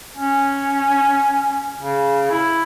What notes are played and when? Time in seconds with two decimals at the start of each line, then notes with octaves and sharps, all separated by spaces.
0.16 C#4
1.80 C#3
2.31 E4